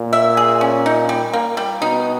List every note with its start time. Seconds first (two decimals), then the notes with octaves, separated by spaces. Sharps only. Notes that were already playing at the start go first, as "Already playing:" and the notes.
Already playing: A#2
0.13 E5
0.37 G#4
0.61 C#4
0.86 D#4
1.09 G3
1.33 A#3
1.57 G3
1.82 B2 D#4